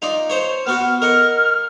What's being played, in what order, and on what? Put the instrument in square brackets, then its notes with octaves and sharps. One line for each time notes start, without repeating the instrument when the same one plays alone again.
[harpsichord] D#4 F4 D5
C5 C#5
[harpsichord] B3 F#4 F#5 [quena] F6
[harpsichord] A#4 D#5 F#5